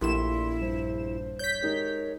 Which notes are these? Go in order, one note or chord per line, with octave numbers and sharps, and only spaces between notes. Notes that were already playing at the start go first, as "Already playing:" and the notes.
A#1 A3 A#3 E4 G4 C6 E7
G2 C5
C#5 G6 B6
G#3 D#4 G4 A#4